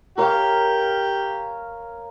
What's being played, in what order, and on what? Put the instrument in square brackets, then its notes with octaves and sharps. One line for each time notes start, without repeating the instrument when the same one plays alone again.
[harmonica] G4 [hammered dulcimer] A#4 C#5 F5